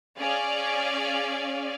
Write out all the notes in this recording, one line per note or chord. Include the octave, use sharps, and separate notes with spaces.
C#4 G#4 D5 F5